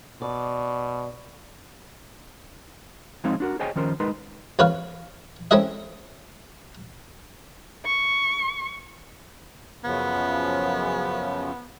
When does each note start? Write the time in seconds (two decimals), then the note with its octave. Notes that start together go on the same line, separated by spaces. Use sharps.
0.22 B2 D5
3.24 F3 G#3 C4 D#4 C#5 F5
3.40 D4 F#4 A#4
3.59 G#4 C5 C#5 D#5 G5 G#5
3.76 D#3 F3 C#4 A#4 C5
4.00 G#3 D#4 A#4 B4 C6
4.59 F2 B4 C#5 F5
5.51 C4 C#4 E4 A4 D#5 E5
7.85 C#6
9.84 F#2 C#3 F3 B3